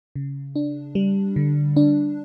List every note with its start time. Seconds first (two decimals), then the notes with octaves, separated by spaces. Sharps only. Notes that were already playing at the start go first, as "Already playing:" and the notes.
0.16 C#3
0.56 D4
0.95 G3
1.36 D3
1.76 D4